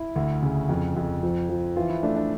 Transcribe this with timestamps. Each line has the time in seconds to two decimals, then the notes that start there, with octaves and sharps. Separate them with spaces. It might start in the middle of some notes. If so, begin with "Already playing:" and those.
Already playing: E4
0.16 D2
0.42 C#3
0.69 F2
0.96 F2
1.23 F3
1.49 F3
1.76 E3 F4
1.90 E4
2.03 A3 D4
2.16 D4